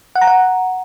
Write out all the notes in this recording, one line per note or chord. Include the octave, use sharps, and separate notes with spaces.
F#5
A#5
F#5